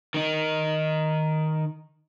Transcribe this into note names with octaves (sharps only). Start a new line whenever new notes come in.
D#3 D#4